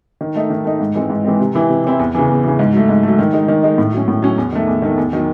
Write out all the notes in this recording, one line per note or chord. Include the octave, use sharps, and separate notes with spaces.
D#3
A3 D#4
D#3
A3 D#4
G#2
E3 G#3 C4
G#2
E3 G#3 C4
C3
E3 C4 E4
C3
E3 C4 E4
E2
C#3 E3
E2
C#3 E3
G#2
F#3 A3
G#2
F#3 A3
D#3
G#3 D#4
D#3
G#3 D#4
A2
F#3 C#4
A2
F#3 C#4
E2
D#3 A3
E2
D#3 A3
E2
D#3 F#3